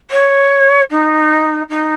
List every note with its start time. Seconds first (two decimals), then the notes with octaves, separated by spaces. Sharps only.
0.10 C#5
0.91 D#4
1.69 D#4